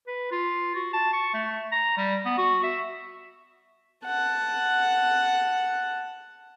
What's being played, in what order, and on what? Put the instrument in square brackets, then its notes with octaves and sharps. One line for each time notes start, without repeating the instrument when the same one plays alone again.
[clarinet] B4
F4
F#4
A5
C#6
A3
A#5
G3
B3
F#4
E5
[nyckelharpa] F#5 A5